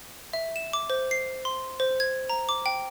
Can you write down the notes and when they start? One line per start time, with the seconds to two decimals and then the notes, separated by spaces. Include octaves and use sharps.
0.33 E5
0.56 E7
0.73 D6
0.90 C5
1.11 C7
1.45 C6
1.80 C5
2.00 G#6
2.30 A#5
2.49 D6
2.66 G5